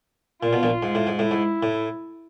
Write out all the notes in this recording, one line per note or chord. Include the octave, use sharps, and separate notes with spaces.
A#2 F4
B2
A#1 A#2
G#2
A2
G#2
A2 E4
G#2
A2